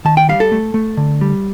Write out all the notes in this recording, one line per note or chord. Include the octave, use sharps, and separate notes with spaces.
D#3 A5
G5
G3 F5
A4
A3
A3
D3
G3